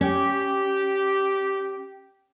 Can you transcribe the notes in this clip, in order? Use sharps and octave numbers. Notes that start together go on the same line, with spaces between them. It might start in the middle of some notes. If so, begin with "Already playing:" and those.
C#4 G4